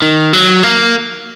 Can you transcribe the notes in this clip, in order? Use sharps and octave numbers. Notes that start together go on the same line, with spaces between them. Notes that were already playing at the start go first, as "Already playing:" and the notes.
D#3
F#3
A#3